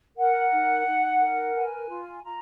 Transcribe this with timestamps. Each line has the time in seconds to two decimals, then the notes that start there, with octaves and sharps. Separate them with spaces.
0.17 A#4 F#5
0.52 D#4
0.86 D#4
1.20 A#4
1.55 B4 G#5
1.89 F4
2.23 F4 A#5